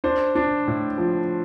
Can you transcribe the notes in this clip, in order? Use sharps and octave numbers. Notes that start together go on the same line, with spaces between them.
D4 C5
D4
A2
F3